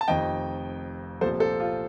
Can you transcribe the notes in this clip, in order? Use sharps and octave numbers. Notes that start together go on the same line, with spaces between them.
A5
F1 F2 D#3 D#5 G5
C2 A#2 F3 A4 C5
A4 C5
F4